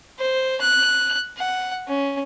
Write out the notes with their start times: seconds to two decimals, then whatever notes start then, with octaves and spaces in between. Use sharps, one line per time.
0.19 C5
0.61 F#6
1.37 F#5
1.88 C#4